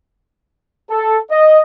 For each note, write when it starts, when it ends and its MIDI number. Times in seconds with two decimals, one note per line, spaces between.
0.90 1.18 69
1.31 1.60 75